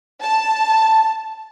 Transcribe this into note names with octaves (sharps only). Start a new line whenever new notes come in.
A5